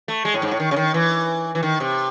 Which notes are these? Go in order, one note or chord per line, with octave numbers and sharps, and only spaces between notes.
A3
G#3
A2
G#2
A2
D#3
C#3
D#3
E3
E3
D#3
C3